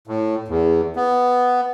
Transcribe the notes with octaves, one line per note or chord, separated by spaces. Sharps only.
A2
E2
B3